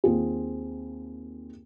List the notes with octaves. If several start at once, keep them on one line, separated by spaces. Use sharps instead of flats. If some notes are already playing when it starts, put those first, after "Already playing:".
D#2 C4 F4 G#4